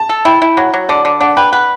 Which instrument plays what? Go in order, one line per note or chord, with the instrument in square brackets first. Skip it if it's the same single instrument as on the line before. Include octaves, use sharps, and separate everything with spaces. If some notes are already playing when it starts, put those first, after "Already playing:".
Already playing: [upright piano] A5
[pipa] A4
[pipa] E4 [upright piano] G5
[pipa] E4
[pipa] F#3 [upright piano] F#5
[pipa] F#3
[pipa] D3 [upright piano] D5
[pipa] D3
[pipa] D4 [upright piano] F#5
[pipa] B4 [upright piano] G5
[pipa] B4 [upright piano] F#5